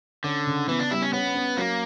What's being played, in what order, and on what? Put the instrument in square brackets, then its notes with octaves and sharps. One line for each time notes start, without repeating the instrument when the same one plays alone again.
[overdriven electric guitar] D3 [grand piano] C#4
[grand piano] C#3
[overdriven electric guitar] E3 [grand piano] B3
[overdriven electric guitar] D4
[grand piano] G3 [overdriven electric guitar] E4
[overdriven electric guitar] C#4
[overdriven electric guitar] B3 [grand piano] C#4
[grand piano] C#4
[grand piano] F#3 [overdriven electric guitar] A#3